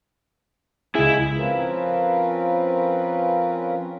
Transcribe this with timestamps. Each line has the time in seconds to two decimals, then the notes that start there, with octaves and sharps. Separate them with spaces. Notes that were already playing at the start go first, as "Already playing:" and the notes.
0.95 C#2 E4 G#4
1.37 F3 C4 C#4 F4 A#4 B4